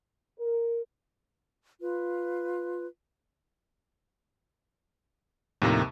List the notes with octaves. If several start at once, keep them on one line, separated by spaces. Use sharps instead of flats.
A#4
F4 B4
D#2 A2 C3 D#3 F3 A#5